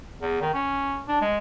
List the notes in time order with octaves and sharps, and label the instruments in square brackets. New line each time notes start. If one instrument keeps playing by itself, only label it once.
[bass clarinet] E2
D#3
C#4
D4
G#3